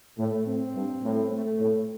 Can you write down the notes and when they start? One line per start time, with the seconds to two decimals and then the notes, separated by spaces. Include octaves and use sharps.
0.18 A2 A3
0.46 A2 C4
0.75 G2
1.03 A2
1.31 A3
1.60 A2